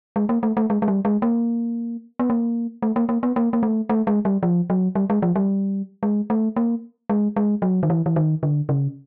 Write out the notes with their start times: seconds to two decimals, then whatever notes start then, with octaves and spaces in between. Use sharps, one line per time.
0.16 G#3
0.29 A#3
0.43 A3
0.57 A3
0.70 G#3
0.82 G#3
0.88 G3
1.05 G#3
1.22 A#3
2.19 B3
2.30 A#3
2.82 A3
2.96 A#3
3.09 A#3
3.23 B3
3.36 A#3
3.53 A#3
3.63 A3
3.89 A3
4.07 G#3
4.25 G3
4.43 F3
4.70 F#3
4.95 G3
5.10 G#3
5.22 F3
5.36 G3
6.03 G#3
6.30 A3
6.56 A#3
7.09 G#3
7.36 G#3
7.62 F#3
7.83 D#3
7.90 E3
8.06 E3
8.16 D#3
8.43 D3
8.69 C#3